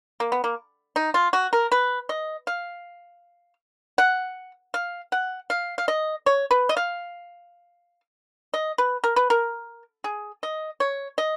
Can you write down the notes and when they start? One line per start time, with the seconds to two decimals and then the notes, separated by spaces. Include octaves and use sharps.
0.20 A#3
0.32 B3
0.44 A#3
0.96 D#4
1.14 F4
1.33 F#4
1.53 A#4
1.72 B4
2.09 D#5
2.47 F5
3.98 F#5
4.74 F5
5.12 F#5
5.50 F5
5.78 F5
5.88 D#5
6.26 C#5
6.51 B4
6.69 D#5
6.77 F5
8.54 D#5
8.78 B4
9.04 A#4
9.16 B4
9.30 A#4
10.04 G#4
10.43 D#5
10.80 C#5
11.18 D#5